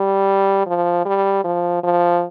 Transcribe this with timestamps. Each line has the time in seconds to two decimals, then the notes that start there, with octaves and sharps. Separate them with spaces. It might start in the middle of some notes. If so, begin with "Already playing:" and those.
Already playing: G3
0.66 F3
1.05 G3
1.44 F3
1.83 F3